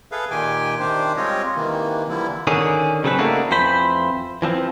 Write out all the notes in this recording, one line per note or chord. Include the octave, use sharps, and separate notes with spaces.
G#4 A4 B4 E5 F5
A#2 D#3 G4 G5 G#5
C3 D#3 D4 G4 C5
G3 G#3 C4 F4 C#5 D#5
C3 D#3 E3 A#3
D3 E3 F3 G3 A#3 E4
D3 D#3 C#4 G#4
C#3 F#3 C4 A4 B4
C#3 A3 A#3 D4 D#4 F#4
F2 E3 C5 B5
E3 F3 C4